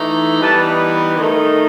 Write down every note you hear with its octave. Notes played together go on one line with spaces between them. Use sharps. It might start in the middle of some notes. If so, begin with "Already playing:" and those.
Already playing: E3 A3 D#4
E3 G3 B3 D#4 A5
D#3 A3 D#4